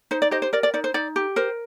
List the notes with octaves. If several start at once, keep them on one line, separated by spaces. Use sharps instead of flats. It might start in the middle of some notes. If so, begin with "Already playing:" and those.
D#4 C5
D5
G4 C5 D#5
C5
A#4 D5
D5
D#4 D5
C5
D#4 D5
G4
A#4 C5